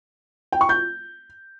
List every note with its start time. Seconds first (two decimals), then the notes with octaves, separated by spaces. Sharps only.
0.52 G5
0.61 C#6
0.69 G6